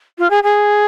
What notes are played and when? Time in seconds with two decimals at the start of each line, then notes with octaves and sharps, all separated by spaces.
0.18 F4
0.30 G#4
0.44 G#4